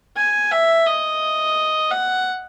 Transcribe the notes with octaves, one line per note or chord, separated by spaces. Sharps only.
G#5
E5
D#5
F#5